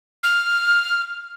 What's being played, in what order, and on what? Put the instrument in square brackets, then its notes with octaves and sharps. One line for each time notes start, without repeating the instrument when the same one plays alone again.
[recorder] F6